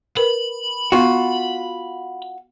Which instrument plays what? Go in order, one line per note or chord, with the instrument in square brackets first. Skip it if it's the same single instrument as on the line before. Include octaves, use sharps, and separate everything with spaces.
[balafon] A#4 B4 [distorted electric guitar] B5
[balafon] B3 [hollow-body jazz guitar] F4 F#4